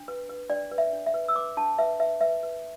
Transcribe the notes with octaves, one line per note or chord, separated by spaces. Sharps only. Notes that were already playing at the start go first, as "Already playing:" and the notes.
Already playing: D4
B4
B4
D4 D5
B4
E5
D4
E5
B4
E6
B4 D6
D4 A5
B4 E5
B4 E5
B4 E5
B4